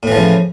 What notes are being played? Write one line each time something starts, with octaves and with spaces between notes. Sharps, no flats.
A2 C#3 E3 F3